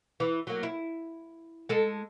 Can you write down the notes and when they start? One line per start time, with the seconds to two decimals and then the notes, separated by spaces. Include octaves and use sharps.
0.20 E3
0.47 F#3 A#3
0.63 E4
1.69 G#3 A4